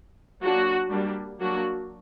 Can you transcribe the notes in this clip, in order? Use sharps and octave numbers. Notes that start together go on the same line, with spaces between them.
F#3 A#3 D4 F#4
G3 A#3 D4
F#3 A#3 D4 F#4